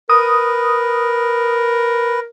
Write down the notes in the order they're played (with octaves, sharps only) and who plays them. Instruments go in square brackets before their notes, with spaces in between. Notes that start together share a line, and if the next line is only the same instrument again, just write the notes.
[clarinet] A#4 [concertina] B4 [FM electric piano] D#6